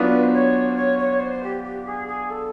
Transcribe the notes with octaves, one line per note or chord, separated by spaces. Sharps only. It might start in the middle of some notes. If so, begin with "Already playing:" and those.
Already playing: F#3 B3 D4 F4 B4
C5
C#5
C5
C#5
C#5
C5
G4
G4
G#4
G#4
A4